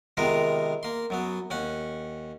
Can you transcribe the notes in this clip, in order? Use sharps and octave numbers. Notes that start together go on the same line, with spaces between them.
C3 D#3 G#3 B3 F4 A#4
A#3 C6
F#2 F#3 B3
D#2 C#4 F#5